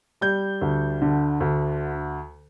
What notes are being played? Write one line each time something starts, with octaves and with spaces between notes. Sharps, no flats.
G3 G6
D2
D3
D2